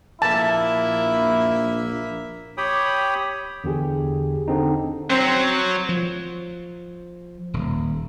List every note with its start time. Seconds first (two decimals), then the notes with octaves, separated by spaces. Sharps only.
0.22 A#1 A#3 E4 E5 A5
2.58 G4 C#5 G5 B5 D#6
3.64 E2 D3 G4 G#4
4.48 D3 C4 D#4
5.10 F#3 C4 C5
5.89 F3
7.54 D#1